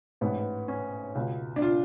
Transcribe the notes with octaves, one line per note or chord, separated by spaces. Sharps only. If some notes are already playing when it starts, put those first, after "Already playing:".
A1 G#2 B3
C#4
C#2 B2
D4
F4